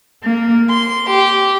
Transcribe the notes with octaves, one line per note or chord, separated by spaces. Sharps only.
A#3
C6
G4